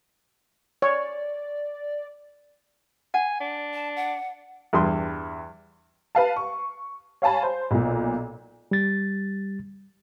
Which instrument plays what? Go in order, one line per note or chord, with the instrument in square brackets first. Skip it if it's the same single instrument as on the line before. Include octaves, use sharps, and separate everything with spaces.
[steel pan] C#5 [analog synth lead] D5
[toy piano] F#5 [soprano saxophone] G#5
[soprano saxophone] D4
[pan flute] A5
F#5
[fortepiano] E2 G2 C6
[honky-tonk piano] B4 F5 A5
C#6
C#5 F5 G#5 A5 B5
C5
B1 A#2
[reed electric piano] G3 A6